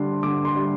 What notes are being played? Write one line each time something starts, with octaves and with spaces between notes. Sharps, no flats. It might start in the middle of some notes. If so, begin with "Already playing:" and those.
Already playing: D3 G3 D4 C6
D3 D6
C6
G3 D4